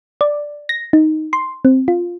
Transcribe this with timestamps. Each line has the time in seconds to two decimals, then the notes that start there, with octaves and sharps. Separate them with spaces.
0.21 D5
0.69 A#6
0.93 D#4
1.33 C6
1.65 C4
1.88 F4